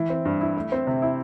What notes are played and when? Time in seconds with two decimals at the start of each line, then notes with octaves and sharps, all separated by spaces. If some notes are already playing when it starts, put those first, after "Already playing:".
Already playing: E3
0.10 C4
0.25 G2
0.41 E4
0.56 A3
0.72 C4
0.87 C3
1.02 E4